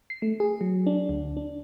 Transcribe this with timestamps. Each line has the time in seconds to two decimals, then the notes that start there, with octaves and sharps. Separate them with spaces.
0.10 C7
0.22 A3
0.40 G#4
0.61 F#3
0.87 D4
1.09 D2
1.37 D4